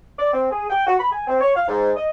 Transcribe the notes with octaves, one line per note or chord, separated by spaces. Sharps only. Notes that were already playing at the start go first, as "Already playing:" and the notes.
D5
C4
G#4
G5
F#4
B5
G#5
C4
C#5
F5
G#2
D#5